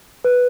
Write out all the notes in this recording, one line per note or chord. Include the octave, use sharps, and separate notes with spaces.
B4